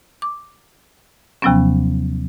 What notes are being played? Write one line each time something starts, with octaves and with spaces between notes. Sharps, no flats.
D6
D#2 C3 F3 F#3 B3 C#4